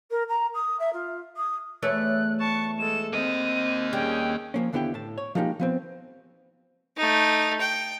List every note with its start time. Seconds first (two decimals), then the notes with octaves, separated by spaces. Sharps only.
0.10 A#4
0.28 A#5
0.54 D#6
0.79 E5
0.93 F4
1.36 D#6
1.82 E2 A3 C#5 F#6
2.39 A5 C#6
2.78 G#3 A4 E7
3.13 A#3 C4 D#5 D#7
3.93 G3 C#4 G#4 G5
4.54 F3 A#3 C#4
4.73 D#2 D3 B3 E4 G4 G5
4.94 A2 A5
5.18 C#5
5.35 F3 G#3 A#3 D#4 G4
5.60 F3 B3 C4
6.97 A3 D#4
7.60 G5